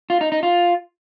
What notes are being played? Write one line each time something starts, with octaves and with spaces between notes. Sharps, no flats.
F4
D#4
D#4
F4